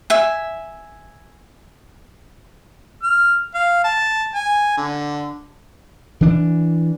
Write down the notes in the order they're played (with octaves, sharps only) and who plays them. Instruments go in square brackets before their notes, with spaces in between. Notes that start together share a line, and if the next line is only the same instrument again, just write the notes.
[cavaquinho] E5 G#5
[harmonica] F6
F5
A5
G#5
D3
[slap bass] E3 D4